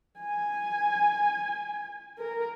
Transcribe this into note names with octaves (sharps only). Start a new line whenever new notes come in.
G#5
A#4